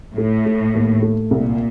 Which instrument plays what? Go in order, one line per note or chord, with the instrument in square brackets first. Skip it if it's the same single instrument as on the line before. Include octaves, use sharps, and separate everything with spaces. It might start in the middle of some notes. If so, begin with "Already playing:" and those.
[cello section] A2 [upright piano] A3
[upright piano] A3
D#2
A3
[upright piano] C2 [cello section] A#2